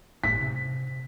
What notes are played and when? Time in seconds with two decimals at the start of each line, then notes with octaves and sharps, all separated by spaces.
0.24 G1 A2 B6
0.41 C3